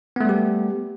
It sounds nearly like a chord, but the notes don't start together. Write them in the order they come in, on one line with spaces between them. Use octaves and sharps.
B3 A3 G3 G4